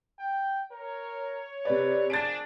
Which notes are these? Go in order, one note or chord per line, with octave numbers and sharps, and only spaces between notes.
G5
A#4 C#5
C3 B4 D5
F3 A#3 D4 G#4 A6 D7